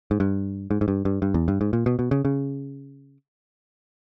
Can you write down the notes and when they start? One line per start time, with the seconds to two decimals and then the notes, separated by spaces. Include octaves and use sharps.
0.11 G#2
0.20 G2
0.71 G#2
0.81 G#2
0.88 G2
1.05 G2
1.22 G2
1.34 E2
1.48 G2
1.61 G#2
1.73 A#2
1.86 B2
1.99 B2
2.11 C#3
2.25 C#3